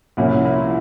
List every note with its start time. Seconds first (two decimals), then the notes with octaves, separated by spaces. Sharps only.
0.17 C2 A#2 F3 A#3 C#4 E4
0.45 E4
0.54 F4